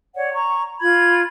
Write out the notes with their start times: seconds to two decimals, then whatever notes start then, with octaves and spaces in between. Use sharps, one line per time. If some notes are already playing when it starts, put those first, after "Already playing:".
0.16 C#5 D5 F#5
0.34 A#5 C#6
0.80 F4 B5 G#6